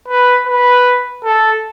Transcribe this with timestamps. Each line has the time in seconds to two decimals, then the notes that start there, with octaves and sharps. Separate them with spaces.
0.08 B4
0.47 B4
1.24 A4